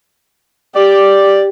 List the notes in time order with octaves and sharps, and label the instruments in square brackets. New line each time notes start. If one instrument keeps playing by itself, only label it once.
[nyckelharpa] G4 [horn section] D5